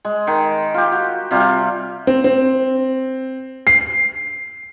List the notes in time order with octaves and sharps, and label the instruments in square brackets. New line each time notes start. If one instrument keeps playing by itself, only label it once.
[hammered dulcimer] G#3
D#3
F4 G4
F#4
C3 G3 F4
[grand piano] C4
C4
C7